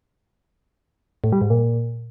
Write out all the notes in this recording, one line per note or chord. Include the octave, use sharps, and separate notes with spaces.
A2
G3
G#2
A#2